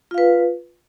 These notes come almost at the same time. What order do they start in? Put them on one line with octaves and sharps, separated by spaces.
F4 F5 B4